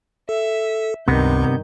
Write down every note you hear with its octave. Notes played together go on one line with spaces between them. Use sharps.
A4 E5
C#2 G2 C3 D#3 B3 G6